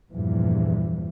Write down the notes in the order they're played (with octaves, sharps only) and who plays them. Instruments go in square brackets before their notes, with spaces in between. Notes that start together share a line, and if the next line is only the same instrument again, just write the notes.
[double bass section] E2 G2 A#2 E3 F3